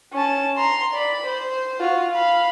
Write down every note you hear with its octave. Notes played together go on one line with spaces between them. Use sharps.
C#4 A5
A#5 C6
D5 B5
C5
F4 F#4
F5 B5